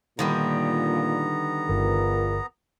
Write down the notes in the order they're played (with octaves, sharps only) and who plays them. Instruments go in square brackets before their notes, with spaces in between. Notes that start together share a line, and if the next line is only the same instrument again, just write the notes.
[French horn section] A#2 [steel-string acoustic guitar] D3 D#3 G3 [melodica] B3 A#5
[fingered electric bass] G1 [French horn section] E2 F4 A#4